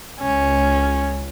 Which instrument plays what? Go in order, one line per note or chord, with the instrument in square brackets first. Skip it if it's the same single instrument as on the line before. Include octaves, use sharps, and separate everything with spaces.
[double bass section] C#2 [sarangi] C#4